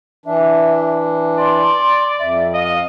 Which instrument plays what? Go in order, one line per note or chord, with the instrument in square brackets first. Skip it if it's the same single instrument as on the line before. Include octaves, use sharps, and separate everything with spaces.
[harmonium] E3 D4 [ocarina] E5
[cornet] D5 [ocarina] C6
[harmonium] F2 [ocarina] E5
[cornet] D#5 [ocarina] F5